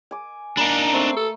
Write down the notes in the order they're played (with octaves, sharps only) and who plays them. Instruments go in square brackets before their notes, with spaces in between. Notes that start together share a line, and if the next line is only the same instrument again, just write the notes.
[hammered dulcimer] G#5 D6
[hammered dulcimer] A#3 A#5 B5 [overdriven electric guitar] D4 D#4
[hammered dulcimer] A3 [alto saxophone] C4
[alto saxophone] A4